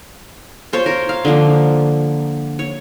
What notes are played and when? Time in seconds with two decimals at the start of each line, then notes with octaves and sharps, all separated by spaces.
0.73 F4 C5 C#5 F5
0.86 A#4
1.09 F5
1.25 D3 F3 A#3
2.59 C#5